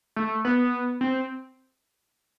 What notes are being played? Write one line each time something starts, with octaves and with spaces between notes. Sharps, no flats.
A3
B3
C4